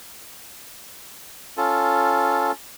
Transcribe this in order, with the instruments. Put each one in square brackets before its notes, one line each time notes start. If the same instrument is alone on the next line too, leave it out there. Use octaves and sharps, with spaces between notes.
[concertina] C#4 F4 A4